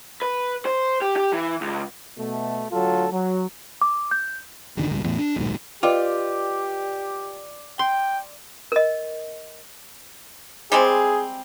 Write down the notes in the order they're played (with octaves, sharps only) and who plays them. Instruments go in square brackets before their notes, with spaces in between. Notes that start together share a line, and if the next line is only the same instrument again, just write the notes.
[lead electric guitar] B4
C5
G4
G4
E3
C#2
[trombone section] B2 A3
D2 F#3 F4 A4
F#3
[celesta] D6
G6
[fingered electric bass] E1 D3 D#3
G#1 C#2 G2
E2 A2
D4
D#1 B1 G#2
[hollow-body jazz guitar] F4 [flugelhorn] G4 [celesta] B4 D#5 G5 [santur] D5
[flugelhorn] G5 [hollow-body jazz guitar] C6
[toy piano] A#4 D#5
[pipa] G3 G#3 C4 [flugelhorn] G#4